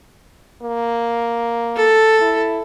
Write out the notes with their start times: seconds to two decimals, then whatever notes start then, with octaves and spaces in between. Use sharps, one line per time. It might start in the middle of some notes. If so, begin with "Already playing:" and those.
0.62 A#3
1.76 A4
2.21 E4